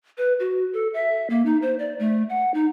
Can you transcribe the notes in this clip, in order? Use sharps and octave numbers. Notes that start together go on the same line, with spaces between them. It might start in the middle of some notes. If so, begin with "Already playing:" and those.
B4
F#4
A4
E5
A#3
D#4
C5
D5
A3
F#5
D#4